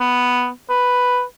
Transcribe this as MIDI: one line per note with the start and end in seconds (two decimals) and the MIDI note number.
0.01 0.49 59
0.70 1.23 71